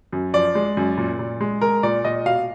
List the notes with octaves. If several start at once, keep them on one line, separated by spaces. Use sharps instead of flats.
F#2
F3 D5
G#3
F#2
A#2
A#2
G#3
G#3 A#4
A#2 D5
A#2 D#5
B2 F5